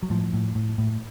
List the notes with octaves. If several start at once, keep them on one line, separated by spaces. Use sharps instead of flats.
F#3
A2 F3
A2
A2
A2